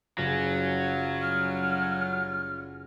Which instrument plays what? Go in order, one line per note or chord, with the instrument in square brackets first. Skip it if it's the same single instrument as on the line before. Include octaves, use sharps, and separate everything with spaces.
[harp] F#1 [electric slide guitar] F#3 [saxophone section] G3 C#4 F4
[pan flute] F6